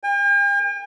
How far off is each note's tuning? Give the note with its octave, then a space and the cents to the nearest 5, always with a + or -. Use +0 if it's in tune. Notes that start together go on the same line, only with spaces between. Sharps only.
G5 +45